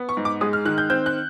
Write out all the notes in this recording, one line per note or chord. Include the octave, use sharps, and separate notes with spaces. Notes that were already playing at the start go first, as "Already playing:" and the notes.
Already playing: B3
C#6
G#2
D6
G#3 D#6
F6
D#3 F#6
G6
C4 G6
F#6